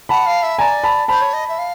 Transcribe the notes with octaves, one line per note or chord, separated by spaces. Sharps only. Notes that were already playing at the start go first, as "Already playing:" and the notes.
F#5 A5 B5
F5
E5
D5 G#5 A#5
A5 B5
C5 A5 B5
C#5
D#5
E5
F5